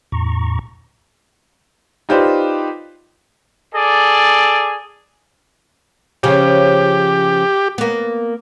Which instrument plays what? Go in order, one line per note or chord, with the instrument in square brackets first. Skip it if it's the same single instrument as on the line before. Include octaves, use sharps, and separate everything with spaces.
[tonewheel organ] E2 A2 A#5 C#6
[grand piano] D#4 F4 G4 B4 C5 D5
[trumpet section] G#4 A4 D5
[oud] C#3 F3 C#4 [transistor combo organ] G4
[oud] A#3 B3